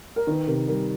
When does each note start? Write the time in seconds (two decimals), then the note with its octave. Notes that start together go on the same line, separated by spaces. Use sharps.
0.16 A#4
0.27 D#3 B4
0.47 C3 A#4
0.68 G3 A#4